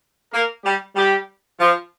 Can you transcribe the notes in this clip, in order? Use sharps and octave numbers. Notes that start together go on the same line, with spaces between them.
A#3 A#4
G3 G4
G3 G4
F3 F4